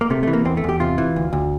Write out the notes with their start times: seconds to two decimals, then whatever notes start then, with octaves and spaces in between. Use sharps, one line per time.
0.01 A#3
0.10 C3 A3
0.23 E3 A3
0.33 A#3
0.45 E2 C4
0.57 A3
0.64 E2 G4
0.80 C3 F4
0.98 E3
1.16 D2
1.33 D2